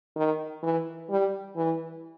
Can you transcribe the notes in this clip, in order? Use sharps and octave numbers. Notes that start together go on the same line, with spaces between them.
D#3
E3
G3
E3